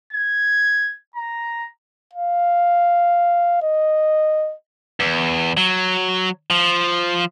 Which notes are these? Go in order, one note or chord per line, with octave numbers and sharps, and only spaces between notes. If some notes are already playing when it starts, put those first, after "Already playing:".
G#6
A#5
F5
D#5
E2
F#3
F3